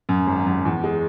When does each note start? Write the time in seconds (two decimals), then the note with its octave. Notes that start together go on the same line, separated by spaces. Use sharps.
0.09 F#2
0.27 G#1
0.47 F#2
0.65 E2
0.84 G#3